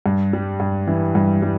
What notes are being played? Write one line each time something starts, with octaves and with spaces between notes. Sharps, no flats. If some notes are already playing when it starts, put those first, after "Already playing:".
G2
G3
G2
E3
G2
G3